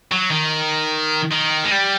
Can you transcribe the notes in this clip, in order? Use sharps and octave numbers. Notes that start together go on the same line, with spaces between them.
F#3
D#3
D#3
G#3
G3